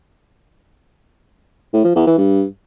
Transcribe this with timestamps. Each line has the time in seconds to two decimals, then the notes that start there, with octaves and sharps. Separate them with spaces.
1.73 A2
1.84 F3
1.95 E2
2.06 E3
2.18 G2